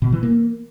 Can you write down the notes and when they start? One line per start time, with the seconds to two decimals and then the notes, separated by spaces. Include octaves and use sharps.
0.02 B2
0.12 E3
0.23 A#3